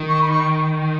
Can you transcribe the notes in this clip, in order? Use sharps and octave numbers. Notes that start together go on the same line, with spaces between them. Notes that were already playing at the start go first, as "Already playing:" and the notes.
Already playing: D#3
C#6
B5
C#6